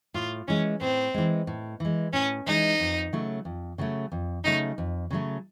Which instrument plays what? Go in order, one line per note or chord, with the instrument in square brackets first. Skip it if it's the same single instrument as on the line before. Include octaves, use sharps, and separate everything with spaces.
[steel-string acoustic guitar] A2 [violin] F4
[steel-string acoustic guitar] E3 G#3 [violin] C#4
[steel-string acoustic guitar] A2 [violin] C4
[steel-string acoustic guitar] E3 G#3
A2
E3 G#3
[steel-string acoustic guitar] A2 [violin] C#4
[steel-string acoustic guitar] E3 G#3 [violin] D#4
[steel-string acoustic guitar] F2
C#3 F#3 A3
F2
C#3 F#3 A3
F2
[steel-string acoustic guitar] C#3 F#3 A3 [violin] D#4
[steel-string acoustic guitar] F2
C#3 F#3 A3